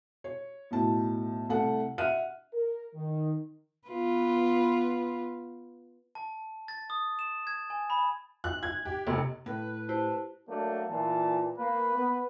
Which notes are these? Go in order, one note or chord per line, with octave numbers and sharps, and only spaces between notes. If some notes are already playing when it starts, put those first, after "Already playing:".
C#5
B1 A2 A5
C2 A3 F#5 A5
E5 F#5 F6 F#6 D#7
A#4
D#3
B3 F4 B4
A5
A6
D#6
E7
G#6
G#5
B5
F#6
G#6
G4
F1
A2 B4
E4 G4 C5 A5
F#3 A3 A#3 D4
A#2 E3 A5
A#3 B4
B3